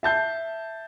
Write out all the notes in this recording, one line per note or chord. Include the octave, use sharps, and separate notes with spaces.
E5 A5 G6 C7